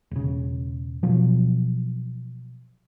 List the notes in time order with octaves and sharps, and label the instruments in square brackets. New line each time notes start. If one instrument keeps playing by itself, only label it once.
[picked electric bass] E1 C#3
B2 F3 F#3